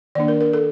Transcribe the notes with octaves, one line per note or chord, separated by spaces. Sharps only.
D#3 A#3 D4 D5
A#4
A#4
A4